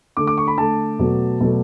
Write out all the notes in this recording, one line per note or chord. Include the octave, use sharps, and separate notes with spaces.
D3 A3 D6
D6
C#6
B5
D3 A3 A5
B2 F#3 A3
B2 F#3 A3